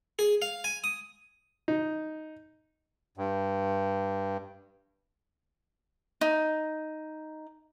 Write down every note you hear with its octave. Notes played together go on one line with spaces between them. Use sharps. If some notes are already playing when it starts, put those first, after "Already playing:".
G#4
F5
G#5
D#6
D#4
G2
D#4